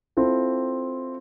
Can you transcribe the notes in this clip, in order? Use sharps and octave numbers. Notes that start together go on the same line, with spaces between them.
C4 E4 F4 A4